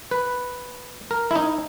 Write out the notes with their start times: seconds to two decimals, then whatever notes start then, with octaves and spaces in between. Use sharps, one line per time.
0.11 B4
1.11 A#4
1.31 E4
1.35 D#4